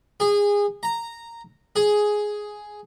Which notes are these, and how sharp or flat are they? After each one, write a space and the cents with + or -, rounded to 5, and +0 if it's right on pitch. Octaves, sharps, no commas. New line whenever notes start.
G#4 -25
A#5 -10
G#4 +5